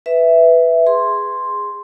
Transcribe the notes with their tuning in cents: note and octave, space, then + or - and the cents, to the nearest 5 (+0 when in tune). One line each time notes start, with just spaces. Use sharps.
B4 +5 E5 +0
G#4 -15 C6 +0